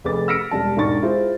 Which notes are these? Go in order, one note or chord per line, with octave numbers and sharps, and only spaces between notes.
F1 G#4 B4 D6 A6
E6 F6 A#6 B6 C#7 D7
E1 G3 A5
E1 G#2 D4 D#4 C#6 A6
E4 F4 G#4 C5